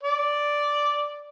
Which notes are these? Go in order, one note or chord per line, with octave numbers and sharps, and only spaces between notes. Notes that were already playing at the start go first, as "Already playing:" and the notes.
D5